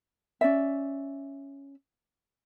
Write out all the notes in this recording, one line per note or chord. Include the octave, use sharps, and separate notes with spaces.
C#4 D5 E5